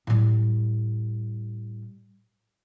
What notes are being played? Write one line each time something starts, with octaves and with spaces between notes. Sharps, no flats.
A2 G3